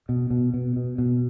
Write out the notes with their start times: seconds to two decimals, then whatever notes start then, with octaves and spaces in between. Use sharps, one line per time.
0.09 B2
0.31 B2
0.54 B2
0.76 B2
0.98 B2